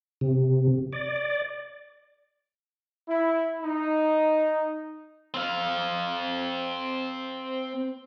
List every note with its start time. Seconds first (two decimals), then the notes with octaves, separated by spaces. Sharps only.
0.21 C3
0.93 D5
3.08 E4
3.62 D#4
5.34 C4 F5